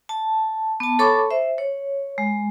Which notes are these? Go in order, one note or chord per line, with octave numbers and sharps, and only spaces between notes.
A5
B3 A5
A4 C#5 A5 B5 C#6 D6
C5 E5
C#5
G#3